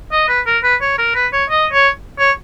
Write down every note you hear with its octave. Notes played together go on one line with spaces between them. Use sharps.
D#5
B4
A#4
B4
C#5
A#4
B4
C#5
D#5
C#5
C#5